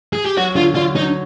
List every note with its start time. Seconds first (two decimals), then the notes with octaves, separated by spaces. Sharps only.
0.13 G#4
0.26 G4
0.37 F#3 F#4
0.56 D3 F4
0.75 D3 F4
0.95 F#3 D#4